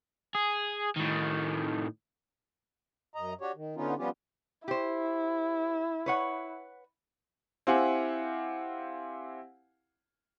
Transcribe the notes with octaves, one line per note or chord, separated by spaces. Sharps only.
G#4
A2 D#3
F#2 D#5 A#5
D4 F#4 G4 C#5
D#3
D3 B3 C#4 D#4 F4
F3 G3 B3 C#4 F4 G4
E4 G4 C5
B4 C#5 F#5
C4 E4 G4 F5 F#5 G#5